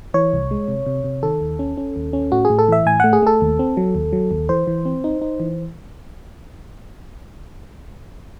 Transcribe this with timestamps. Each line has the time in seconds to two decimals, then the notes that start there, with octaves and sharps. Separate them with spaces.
0.14 E3 C#5
0.33 C2
0.51 G#3
0.68 C3
0.86 C3
1.04 C3
1.23 D#3 A4
1.41 D#2
1.59 C#4
1.77 C#4
1.96 D#2
2.13 C#4
2.32 A2 F#4
2.45 G#4
2.50 A2
2.59 A4
2.68 E3 E5
2.86 A2 G#5
3.00 A3 F#5
3.13 G#4
3.23 A3 A4
3.41 D#2
3.59 C4
3.77 F#3
3.95 D#2
4.13 F#3
4.31 D#2
4.49 E3 C5
4.67 E3
4.85 C4
5.04 D#4
5.22 D#4
5.40 E3